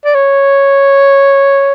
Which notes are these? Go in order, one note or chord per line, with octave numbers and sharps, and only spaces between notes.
D5
C#5